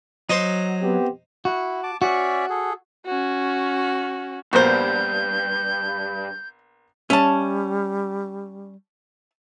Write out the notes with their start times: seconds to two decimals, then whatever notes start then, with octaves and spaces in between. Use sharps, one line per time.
0.30 F#3 D#4 C5
0.82 B3 C4 G4
1.45 E4 F#4
1.83 A5 D6
2.02 C#4 F#4 D5 E5
2.50 G#4 A4
3.06 C#4 F#4
4.53 A#1 G2 B3 F#4 A#4 C5 G6
7.10 G3 C#4 E5 A5